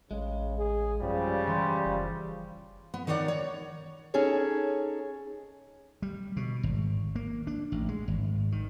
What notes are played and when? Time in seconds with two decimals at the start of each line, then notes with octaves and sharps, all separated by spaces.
0.11 A1 C#3 G#3
0.58 G#4
1.01 F#2 C#3 F3 G3
1.48 E3 C6
1.85 F#1 F3
2.94 B3
3.07 D#3 D#4 C#5 D5 F#5
3.28 C#5
4.14 C#4 D#4 G#4 A4 C#5
6.02 G3
6.37 B2
6.63 G#1
7.16 A#3
7.47 D4
7.72 A1
7.89 G#3
8.08 G#1
8.52 D#3